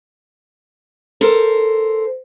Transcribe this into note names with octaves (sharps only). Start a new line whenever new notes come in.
A4 A#4 C5